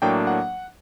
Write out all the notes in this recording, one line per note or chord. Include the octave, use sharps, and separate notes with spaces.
A2 F#3 A#3 D4 G5
F#5